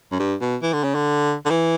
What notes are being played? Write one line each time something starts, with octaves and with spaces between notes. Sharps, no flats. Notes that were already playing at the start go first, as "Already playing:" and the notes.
F#2
G2
B2
E3
D3
C#3
D3
D3
E3